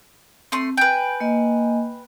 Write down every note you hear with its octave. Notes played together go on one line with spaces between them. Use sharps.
A3 C4 C6
B4 G5 G#5
A#3 D#5 G#5